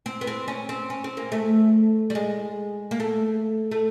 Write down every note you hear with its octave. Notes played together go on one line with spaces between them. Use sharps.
C4
B3
C4
C#4
C4
C#4
C4
A#3
A3
G3
G#3
A#3
A3
A3